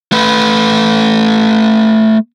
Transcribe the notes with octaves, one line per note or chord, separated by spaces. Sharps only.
A3 B4